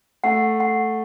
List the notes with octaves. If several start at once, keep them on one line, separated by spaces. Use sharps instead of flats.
A3 F#5
F#5